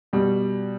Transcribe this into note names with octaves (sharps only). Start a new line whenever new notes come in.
B2 G3